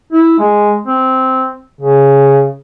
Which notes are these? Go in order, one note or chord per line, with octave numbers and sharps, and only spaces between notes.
E4
G#3
C4
C#3